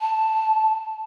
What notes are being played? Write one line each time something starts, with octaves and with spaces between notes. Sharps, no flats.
A5